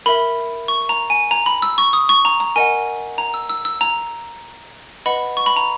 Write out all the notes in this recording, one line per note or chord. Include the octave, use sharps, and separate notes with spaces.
A#4 E5 B5
C#6
A#5
G#5
A#5
B5
E6
C#6
D#6
C#6
A#5
A#5
A#4 D#5 F#5 G#5
A#5
E6
E6
E6
A#5
B4 D#5 F#5 B5
C#6
B5
A#5